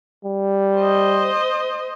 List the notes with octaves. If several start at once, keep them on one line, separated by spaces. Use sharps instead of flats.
G3
C5 D#5